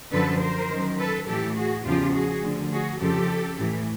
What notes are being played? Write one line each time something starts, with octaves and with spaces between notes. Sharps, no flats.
F#2 D3 F3 A4 B4
A#4 C5
F#2 D#3
A4 B4
A2 E3 G4 A4
F#4 G#4
E2 C#3 F3 F4 G4
F#4 G#4
D2 D3 F3
F#4 G#4
F2 C#3 F3 G4 A4
A2 E3